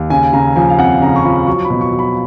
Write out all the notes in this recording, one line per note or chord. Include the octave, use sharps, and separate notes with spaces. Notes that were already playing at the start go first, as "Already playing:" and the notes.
Already playing: D#2
C#3 G#5
C#3 A#5
F3 G#5
F5
F2 F#5
C#3 A#5
C#6
F3 B5
F#3 C#6
B5
B2
C#6
F#3
B5